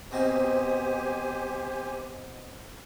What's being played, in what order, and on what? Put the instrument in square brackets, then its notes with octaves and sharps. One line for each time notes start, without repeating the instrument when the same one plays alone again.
[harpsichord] B2 C4 D#4 [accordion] G4 C5 G#5